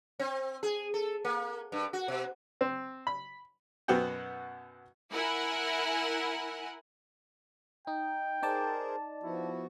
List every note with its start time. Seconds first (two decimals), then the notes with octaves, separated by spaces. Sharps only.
0.19 C4
0.63 G#4
0.94 A4
1.25 A#3
1.72 G2
1.93 F#4
2.08 B2
2.61 C4
3.07 B5
3.88 F#2 B2 B3 F#4 F#5 G5
5.12 E4 A#4 F#5 G#5
7.87 D#4 G5
8.43 D#4 G#4 A#4 C5 D5 A5
9.23 F3 B3 E4 F#4